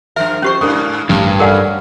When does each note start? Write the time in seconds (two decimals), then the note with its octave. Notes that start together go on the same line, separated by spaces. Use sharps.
0.16 G2 F3 A#4 E5
0.42 F2 C#4 G4 B4 C5 C#6
0.61 G#2 A#3 D4 A#4 D#6
1.09 A1 G2 A#4
1.40 C#4 A4 A#4 D5 F#5 G#5